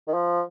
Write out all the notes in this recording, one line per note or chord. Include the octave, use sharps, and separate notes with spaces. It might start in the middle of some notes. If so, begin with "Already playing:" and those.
D#3
F3